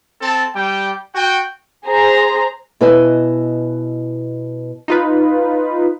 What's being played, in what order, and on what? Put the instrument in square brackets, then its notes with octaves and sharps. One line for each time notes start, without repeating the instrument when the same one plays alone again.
[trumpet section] C4 A4 A5
G3 G5
F#4 G5
[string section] G#4 C5 A#5
[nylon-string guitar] B2 E4 B4 D#5 G#5 A5
[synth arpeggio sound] D#4 F4 B4